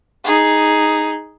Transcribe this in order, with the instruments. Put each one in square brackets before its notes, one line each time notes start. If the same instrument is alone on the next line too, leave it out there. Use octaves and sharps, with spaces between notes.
[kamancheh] D#4 G#4